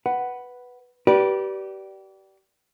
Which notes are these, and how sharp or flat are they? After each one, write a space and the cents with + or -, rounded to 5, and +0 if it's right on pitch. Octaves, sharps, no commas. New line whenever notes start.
B4 +0 F#5 +10
G4 -30 B4 -30 D5 +0